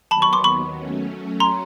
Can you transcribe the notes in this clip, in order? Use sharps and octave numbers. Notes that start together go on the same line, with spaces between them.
D#2 D#3 F#3 B3 A5 B5
B5 C#6
C6 D6
B5 C#6
F#3 A3 C#4
A#5 C6